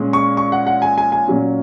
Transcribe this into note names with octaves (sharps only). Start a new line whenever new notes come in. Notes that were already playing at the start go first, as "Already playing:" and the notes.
Already playing: A#2 G#3 C#4
C#6
C#6
F#5
F#5
G#5
G#5
G#5
A#2 F#3 C#4